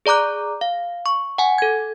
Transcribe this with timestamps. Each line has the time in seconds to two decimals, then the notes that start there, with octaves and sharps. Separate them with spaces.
0.06 G#4 D5 A#5 D6 F#6
0.61 F5
1.06 C#6
1.38 F#5 G#5
1.58 A4 G#6